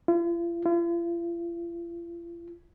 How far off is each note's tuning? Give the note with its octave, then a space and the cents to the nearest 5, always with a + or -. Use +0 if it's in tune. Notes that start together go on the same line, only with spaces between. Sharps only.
F4 -45
F4 -45